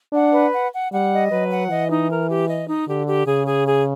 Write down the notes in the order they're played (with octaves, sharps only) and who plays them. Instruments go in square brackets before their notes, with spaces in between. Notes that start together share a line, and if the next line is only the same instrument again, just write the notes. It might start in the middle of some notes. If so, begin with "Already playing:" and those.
[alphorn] D4 [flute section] F#5
[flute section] B4
F#5
F#5
[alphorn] G3 [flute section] F#5
[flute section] D#5
[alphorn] F#3 [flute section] B4
[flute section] F#5
[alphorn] E3 [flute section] D#5
[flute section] D#4
A#4
G4
D#5
D#4
[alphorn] D3 [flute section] G4
[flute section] G4
[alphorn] C#3 [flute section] G#4
[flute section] G#4
G#4